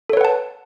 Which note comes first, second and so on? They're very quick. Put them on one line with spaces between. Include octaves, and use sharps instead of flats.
A4 C#5 B4 F#5 A5